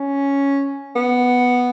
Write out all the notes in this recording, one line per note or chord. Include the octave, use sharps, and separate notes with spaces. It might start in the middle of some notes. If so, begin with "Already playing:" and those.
Already playing: C#4
B3